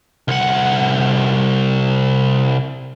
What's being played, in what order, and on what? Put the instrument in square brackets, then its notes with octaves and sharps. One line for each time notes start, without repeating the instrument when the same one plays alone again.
[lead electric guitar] C2 F#5